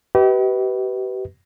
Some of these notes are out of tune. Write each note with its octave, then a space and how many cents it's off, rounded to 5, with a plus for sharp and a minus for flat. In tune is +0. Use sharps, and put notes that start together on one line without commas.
G4 -35 B4 +0 D#5 +40